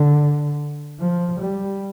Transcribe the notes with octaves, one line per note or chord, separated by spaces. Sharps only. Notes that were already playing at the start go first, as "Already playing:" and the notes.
Already playing: D3
F3
G3